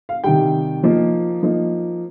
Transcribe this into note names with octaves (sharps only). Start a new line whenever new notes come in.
F5
C3 D#3 G3 G5
F3 A#3 D#4
F3 A#3 D#4